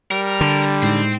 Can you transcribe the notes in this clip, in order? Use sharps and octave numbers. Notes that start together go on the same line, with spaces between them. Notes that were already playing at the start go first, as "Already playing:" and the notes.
G3 A#4
D3
A2 G#3 C4 D#4